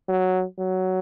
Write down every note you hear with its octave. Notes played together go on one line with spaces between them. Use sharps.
F#3
F#3